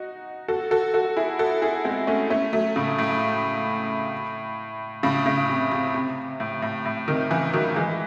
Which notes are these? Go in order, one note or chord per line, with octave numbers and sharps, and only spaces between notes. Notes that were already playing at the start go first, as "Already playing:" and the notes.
Already playing: D#4 F#4
F#4 A4
F#4 A4
F#4 A4
E4 G#4
F#4 A4
E4 G#4
G#3 C4
A3 C#4
A3 C#4
F#3 A3
A2 C#3
A2
A2 C#3
A2 C#3
C3
C3
C3
A2
A2
A2
C3 D#3
C#3 E3
D#3 F#3
E3 G#3